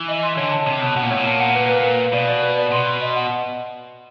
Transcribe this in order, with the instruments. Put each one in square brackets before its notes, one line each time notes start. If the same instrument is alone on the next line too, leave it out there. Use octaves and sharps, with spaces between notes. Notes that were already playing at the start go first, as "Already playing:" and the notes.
Already playing: [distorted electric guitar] E3
[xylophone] D#5
C6
[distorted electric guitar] D3 [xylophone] C#5
[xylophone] A5
[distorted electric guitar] C3 [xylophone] C#5
[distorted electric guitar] B2 [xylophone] A5
[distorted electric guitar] B2 [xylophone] F#5
[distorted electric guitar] A#2
[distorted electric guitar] A2 [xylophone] C#5
[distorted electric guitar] A#2
[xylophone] A5
F#5
B4
B4
B4
F5
[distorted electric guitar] B2 [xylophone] D5
[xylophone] D5
B4
D5
[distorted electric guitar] B2 [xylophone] C6
[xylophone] C6
D#5
F#5